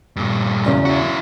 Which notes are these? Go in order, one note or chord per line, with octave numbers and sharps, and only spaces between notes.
G2 A#2
E2 C#3 F#3
E4 F#4